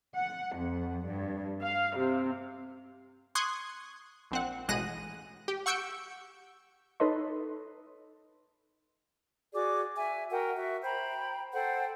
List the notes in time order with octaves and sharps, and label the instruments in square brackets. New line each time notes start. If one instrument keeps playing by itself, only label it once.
[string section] F#5
F2
G2
F5
C3
[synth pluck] C6 C#6 D#6 F#6 G#6
A#1 C4 F#5
A1 B2 G#3 F#6 A#6 D#7
G4
F#5 C#6 E6 G6 C#7 D7
[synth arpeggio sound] D#4 A4 B4 C#5 D#5 C6
[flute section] F#4 G#4 D5 D6
E5 G#5
F#4 A#4 F#5 G5
F#4 E5
C5 G5 A#5 B5
A4 C5 F#5 G5